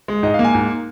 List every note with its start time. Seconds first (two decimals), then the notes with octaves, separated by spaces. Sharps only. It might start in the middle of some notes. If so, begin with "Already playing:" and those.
0.08 G#3
0.23 G#2 D#5
0.34 F5
0.39 A#3
0.44 G#5
0.55 G#2